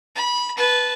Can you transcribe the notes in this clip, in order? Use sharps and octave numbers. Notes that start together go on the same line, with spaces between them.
B5
B4 A5